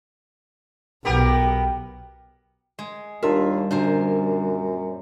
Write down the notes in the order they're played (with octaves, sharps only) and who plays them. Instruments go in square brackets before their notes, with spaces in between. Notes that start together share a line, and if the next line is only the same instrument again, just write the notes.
[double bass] B1 [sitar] B3 G4 A#4
[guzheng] G#3
[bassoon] D#2 [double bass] G3 [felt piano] D4 F4 A#4 [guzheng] E5
[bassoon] F#2 [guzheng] A#2 A#4 C5 [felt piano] D3